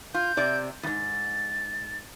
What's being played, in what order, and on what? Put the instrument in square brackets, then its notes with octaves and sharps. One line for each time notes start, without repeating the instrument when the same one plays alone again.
[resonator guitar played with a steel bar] F4 [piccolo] G6
[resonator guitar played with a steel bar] C3 D5 E5
[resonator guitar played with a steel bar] E2 G#2 [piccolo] A6